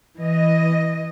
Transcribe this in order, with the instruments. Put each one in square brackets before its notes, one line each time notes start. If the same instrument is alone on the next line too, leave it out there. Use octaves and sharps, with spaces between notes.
[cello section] E3 D#5